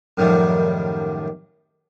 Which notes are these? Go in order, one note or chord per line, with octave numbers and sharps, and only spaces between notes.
F#2 A2 D#3 F3 G3